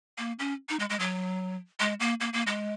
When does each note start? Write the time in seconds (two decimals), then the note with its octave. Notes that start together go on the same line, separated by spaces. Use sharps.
0.18 A#3
0.39 C#4
0.69 D#4
0.79 G#3
0.89 G#3
0.99 F#3
1.80 G#3
2.00 A#3
2.20 A#3
2.33 A#3
2.47 G#3